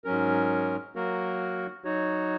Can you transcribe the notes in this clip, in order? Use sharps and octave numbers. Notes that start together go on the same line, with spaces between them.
G#2 F#3 C#4 A#4
F#3 A#3 F#4 A#4
F#3 D#4 F#4 C#5